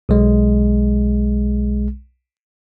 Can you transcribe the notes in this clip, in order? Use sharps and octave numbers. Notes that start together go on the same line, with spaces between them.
B1 G#3